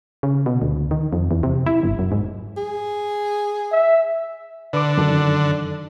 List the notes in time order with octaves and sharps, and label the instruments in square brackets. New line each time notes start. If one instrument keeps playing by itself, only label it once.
[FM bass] C#3
B2
D2
D#3
F2
E2
C3
E4
G1
F#2
G#2
[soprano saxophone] G#4
[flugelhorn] E5
[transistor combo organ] D3 [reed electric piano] B4 D6
[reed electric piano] F#2 D#3 A4